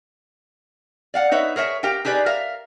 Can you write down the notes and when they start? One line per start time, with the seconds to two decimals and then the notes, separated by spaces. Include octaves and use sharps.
1.14 D5 F5 F#5
1.31 D#4 B4 C#5 E5
1.56 G#4 A#4 C#5 E5
1.83 G4 A#4 F5 G5
2.05 D#4 G4 G#4 B4 D5
2.26 A#4 E5 F5